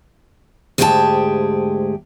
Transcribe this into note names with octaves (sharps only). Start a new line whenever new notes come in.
D2 G#2 G4 G#4 G5 A5